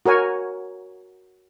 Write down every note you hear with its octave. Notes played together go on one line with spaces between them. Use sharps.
F#4 A#4 C#5 G#5